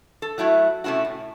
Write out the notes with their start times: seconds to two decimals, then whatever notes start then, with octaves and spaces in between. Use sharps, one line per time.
0.22 A4
0.38 F#3 A3 E4 F#4
0.84 C3 A3 C#4 E4 F#4
1.05 A2